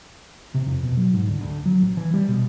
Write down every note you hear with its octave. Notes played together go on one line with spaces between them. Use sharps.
C3
F2
B2
F#3
G#2
D2
D2
F#3
A1
E3
G3
B2